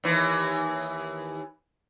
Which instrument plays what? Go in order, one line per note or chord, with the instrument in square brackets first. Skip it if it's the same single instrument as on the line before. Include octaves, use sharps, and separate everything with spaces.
[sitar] D#2 E3